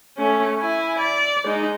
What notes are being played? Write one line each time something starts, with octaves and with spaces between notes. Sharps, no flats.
A3 C#4
E4 G#5
D5
G#3 D#4